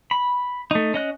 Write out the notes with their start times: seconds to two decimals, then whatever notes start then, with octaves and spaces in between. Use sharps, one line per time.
0.11 B5
0.71 A3 D#4
0.94 C#4 D#5 F#6